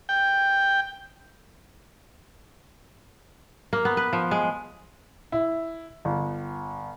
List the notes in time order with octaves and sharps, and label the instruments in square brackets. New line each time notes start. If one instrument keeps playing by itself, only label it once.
[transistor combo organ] G5
[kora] A#3
B3
B4
F3
G#3
[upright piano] E4
G1